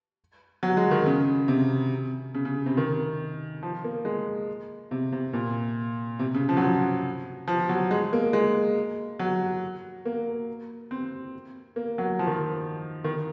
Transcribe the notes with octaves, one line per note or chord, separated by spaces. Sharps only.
F#3
G#3
D#3
C#3
C3
C#3
C#3
C3
D#3
F3
A#3
G#3
C3
C3
A#2
C3
C#3
F3
F#3
F3
F3
F#3
G#3
A#3
G#3
F#3
A#3
C4
A#3
F#3
F3
D#3
F3
D#3